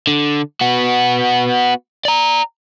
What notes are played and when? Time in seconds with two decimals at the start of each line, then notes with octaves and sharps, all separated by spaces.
0.07 D3
0.61 B3 F#4
2.05 D5 A#5